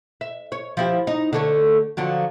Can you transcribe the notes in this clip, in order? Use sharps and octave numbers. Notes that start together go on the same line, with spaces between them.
E5
C#5
F3 E4 G4
D#4
D3 A3 C#5
D3 F3 F#3